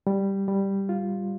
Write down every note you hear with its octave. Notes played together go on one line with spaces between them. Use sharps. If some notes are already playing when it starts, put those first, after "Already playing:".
G3
G3
F4